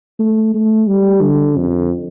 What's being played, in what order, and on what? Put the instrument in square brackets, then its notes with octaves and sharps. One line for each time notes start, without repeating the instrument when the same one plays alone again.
[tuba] A3
A3
G3
D3
F2